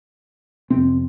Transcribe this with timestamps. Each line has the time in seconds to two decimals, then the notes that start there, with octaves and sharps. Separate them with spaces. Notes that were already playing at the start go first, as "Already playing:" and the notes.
0.70 F2 C3 C4